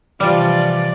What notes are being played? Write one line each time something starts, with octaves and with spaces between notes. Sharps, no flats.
C3 E3 F3 G3 D5